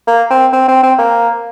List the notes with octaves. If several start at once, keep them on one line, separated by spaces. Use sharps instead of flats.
A#3
C4
C4
C4
C4
A#3